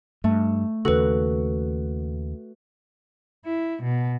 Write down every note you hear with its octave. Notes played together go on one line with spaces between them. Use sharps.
G2 A3
D#2 C#3 F#4 A4 B4
E4
B2